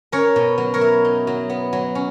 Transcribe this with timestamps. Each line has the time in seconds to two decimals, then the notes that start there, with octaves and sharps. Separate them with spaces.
0.12 C#4 A#4 C#5
0.36 B2
0.58 F#3
0.74 A#4 C#5
0.81 E4
1.05 D#4
1.27 F#3
1.50 B3
1.73 F#3
1.95 C#4